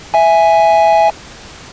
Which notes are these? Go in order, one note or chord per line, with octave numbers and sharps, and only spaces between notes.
E5 G#5